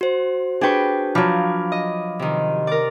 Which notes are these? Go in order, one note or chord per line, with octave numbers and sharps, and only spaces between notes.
F#4 C5
D4 G#4 B4 G5 C#6
F3 F#3 F5 B5 D6
D#5
C3 D#3
A#4 D5